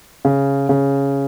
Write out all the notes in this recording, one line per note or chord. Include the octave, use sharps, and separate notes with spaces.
C#3
C#3